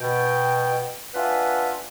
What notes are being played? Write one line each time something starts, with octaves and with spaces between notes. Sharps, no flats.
B2 G5
D4 F4 B4 E5 F#5 G#5